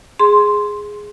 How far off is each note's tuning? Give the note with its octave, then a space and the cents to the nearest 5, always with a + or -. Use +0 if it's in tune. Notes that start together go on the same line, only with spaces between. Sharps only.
G#4 +0 C6 +0